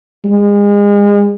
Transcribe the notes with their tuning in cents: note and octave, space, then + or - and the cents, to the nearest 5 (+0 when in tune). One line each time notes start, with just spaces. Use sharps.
G#3 -35